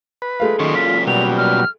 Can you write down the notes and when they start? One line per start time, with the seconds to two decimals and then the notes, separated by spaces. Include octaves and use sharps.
0.22 B4
0.40 G#3 A3 F5
0.59 F#2 A#2 D#3 C6 C#6
0.75 F4 B6
1.07 B2 F#3 G3 F7
1.37 F6